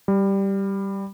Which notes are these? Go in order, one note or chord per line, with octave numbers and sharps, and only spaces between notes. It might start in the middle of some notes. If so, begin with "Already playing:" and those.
G3